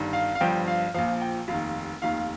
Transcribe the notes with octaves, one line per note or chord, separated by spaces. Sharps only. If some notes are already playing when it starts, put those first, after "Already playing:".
Already playing: G1 G2 D#3
F5
F5
G1 G2 F3 G5
F5
A#1 A#2 F3 F5
G5
F1 D#2 D#3 F5
F1 D#2 D#3 F5